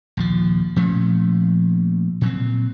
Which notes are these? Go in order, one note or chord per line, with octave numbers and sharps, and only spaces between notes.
A#1 D#2 F3
A#2 F3 A3 C#4
A#2 F#3 C4